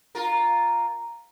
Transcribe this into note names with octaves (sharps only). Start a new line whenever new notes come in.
F4 A#4